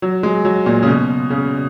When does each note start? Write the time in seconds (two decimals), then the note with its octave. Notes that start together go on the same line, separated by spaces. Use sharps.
0.02 F#3
0.23 G#3
0.45 F#3
0.66 A#2
0.83 C#3
0.87 B2
1.30 C#3